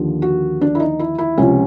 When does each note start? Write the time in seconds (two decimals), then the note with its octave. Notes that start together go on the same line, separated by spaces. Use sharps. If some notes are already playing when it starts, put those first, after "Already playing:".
Already playing: D#2 D3 F3
0.22 F#4
0.61 D4
0.75 E4
0.80 D#4
0.99 E4
1.18 E4
1.37 C#2 C3 F3 C#4